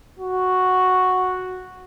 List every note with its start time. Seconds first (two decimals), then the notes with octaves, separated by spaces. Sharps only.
0.20 F#4